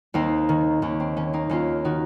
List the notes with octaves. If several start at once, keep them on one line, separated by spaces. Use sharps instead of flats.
D#2 C4 D#4
D#3
D#2 C#4
C4
D#3 C#4
C4 D#4
D#2 C#4 F4
D#3 D#4 F#4